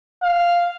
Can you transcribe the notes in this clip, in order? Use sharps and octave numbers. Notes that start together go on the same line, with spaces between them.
F5